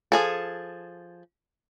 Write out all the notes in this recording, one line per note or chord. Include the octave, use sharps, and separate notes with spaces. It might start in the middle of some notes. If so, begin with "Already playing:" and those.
F3 G#4 A4